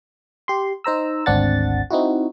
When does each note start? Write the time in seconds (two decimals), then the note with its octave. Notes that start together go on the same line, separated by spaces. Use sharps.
0.48 G4 C6
0.84 D#4 C5 A#5 E6
1.26 G#1 D2 C4 D4 F#5 A6
1.90 C4 D#4 E4 F#4